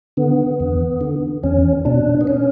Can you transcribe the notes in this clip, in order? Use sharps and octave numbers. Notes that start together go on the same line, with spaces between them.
D3 B3
E2
D3
E2 C#4
B2 D4
B3
C#4